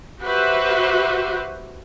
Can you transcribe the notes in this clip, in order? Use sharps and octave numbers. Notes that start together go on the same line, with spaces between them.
F#4 G4 B4 C5 E5